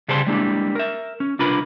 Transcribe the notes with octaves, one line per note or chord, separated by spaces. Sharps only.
C#3 G3 G#4 C5 A5 C6
G3 G#3 A#3 D4 E4
A#4 E5
C#4
C2 D4 F4 A#4 B4 B5